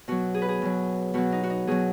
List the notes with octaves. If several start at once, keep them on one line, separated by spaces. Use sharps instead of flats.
B2 F#3 F#4
G#4
B4
G#4
B2 F#3
B2 F#3 F#4
D#4
F#4
D#4
B2 F#3 G#4